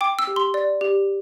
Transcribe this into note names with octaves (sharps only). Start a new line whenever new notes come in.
G5 D6
E6
G4
C6
D5
G4